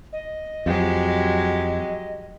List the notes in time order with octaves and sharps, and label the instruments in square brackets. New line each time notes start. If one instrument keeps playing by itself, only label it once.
[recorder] D#5
[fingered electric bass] F2 [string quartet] F#3 G#3 G4